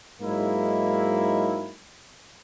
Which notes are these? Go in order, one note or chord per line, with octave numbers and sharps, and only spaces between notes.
G#2 F#3 G#3 A#3 D#4 E4